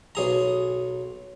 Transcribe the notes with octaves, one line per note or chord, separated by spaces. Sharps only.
B1 G#4 A#5